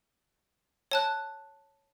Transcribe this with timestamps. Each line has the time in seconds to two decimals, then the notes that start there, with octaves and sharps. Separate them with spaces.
0.92 C#5 A5 F#6